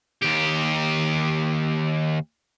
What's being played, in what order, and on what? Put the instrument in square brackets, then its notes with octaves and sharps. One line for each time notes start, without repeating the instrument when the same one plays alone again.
[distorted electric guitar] D#2 G4